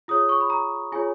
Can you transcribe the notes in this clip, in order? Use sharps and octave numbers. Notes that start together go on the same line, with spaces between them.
F4 G#4 C#5 D#6
C#6
B5
A#5
F4 G#4 C#5 G#5